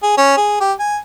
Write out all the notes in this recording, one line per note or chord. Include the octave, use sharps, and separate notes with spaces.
G#4
C#4
G#4
G4
G#5